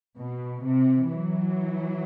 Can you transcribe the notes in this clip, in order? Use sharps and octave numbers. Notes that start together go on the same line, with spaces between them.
B2
C3
E3 F#3